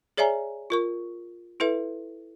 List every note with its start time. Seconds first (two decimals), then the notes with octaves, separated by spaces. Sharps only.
0.17 G#4 C#5 D5 E5 G#5 A#5
0.70 F4 A#4 C#6
1.60 E4 A4 B4 E5